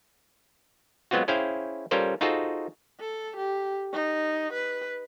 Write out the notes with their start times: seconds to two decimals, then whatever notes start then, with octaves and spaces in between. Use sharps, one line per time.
1.11 F#3 G#3 B3 C4 F4 F#4
1.28 C#4 E4 G#4 C5 F5 G5
1.91 G3 C#4 F4 A4 A#4 C5
2.21 D#4 F4 F#4 G#4 A4 C5
3.00 A4
3.37 G4
3.93 D#4
4.53 B4